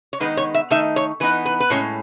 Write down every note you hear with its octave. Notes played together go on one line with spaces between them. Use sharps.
C#5
D#3 G#3 B3 D#4 B4
C#5
E5
D#3 A3 D#4 E5
C#5
E3 B3 D#4 B4
B4
B4
A2 G#3 C#4 C#5